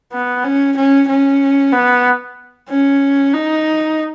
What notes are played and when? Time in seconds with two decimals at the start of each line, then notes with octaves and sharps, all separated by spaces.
0.13 B3
0.44 C#4
0.76 C#4
1.08 C#4
1.73 B3
2.70 C#4
3.34 D#4